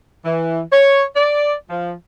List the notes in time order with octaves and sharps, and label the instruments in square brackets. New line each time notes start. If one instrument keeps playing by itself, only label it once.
[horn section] E3
C#5
D5
F3